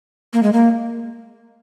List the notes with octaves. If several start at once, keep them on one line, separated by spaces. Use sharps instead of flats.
A#3
G#3
A#3